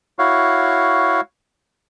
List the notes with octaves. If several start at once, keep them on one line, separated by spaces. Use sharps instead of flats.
E4 F#4 C#5 F5